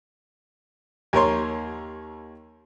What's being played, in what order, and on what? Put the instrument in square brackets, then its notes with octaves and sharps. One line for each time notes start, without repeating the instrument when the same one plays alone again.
[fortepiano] D#2 A#4 C#5 C6